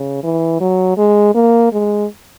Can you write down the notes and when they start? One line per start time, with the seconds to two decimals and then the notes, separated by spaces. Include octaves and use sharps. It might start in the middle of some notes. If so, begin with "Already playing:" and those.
Already playing: C#3
0.23 E3
0.60 F#3
0.97 G#3
1.35 A#3
1.72 G#3